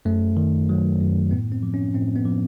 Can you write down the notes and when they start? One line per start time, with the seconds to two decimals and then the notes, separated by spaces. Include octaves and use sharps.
0.05 F#2 A3
0.37 D#3
0.69 F#3
1.01 F#2
1.31 A2 B3
1.52 C4
1.63 F3
1.74 C#4
1.94 A2 C4
2.16 B3
2.25 F3